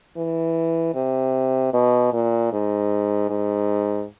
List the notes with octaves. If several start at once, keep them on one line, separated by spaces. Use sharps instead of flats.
E3
C3
B2
A#2
G#2
G#2